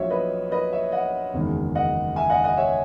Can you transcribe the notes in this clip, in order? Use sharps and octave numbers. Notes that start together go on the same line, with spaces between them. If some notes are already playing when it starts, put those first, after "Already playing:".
Already playing: A#1 A#2 F#3 C#5 E5
B4 D#5
B4 D#5
C#5 E5
D#5 F#5
F#1 E2 D#3 G#3
D#5 F#5
E5 G#5
D#5 F#5
D#5 F#5
C#5 E5